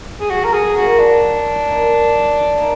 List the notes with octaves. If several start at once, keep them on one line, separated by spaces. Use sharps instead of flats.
G#4
F#3 F#4
A#4
G#4
A#3 D#4 F#4 A#4
D4
F#3
A#3 D#4 A#4
F#3
A#3 D#4 A#4